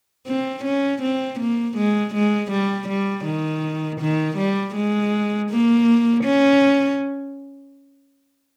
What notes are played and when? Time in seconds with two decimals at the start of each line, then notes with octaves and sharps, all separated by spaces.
0.27 C4
0.64 C#4
1.03 C4
1.40 A#3
1.77 G#3
2.14 G#3
2.51 G3
2.89 G3
3.25 D#3
4.01 D#3
4.38 G3
4.75 G#3
5.50 A#3
6.24 C#4